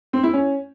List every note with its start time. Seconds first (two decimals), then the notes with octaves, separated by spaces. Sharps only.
0.13 C4
0.23 E4
0.33 C#4